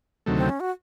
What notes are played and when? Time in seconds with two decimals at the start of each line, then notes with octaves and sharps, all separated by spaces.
0.26 D2 C3 D#3 F#3 A3
0.38 C4
0.49 C#4
0.60 F#4